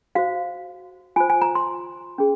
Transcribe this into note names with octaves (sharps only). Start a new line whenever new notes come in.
F#4 C5 F5
F4 C5 G#5
G#5
A#5
C6
C#4 G#4